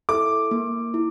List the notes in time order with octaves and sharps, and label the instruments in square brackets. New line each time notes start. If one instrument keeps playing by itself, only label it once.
[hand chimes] E4 A4 E5 [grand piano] D6
[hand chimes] A#3
E4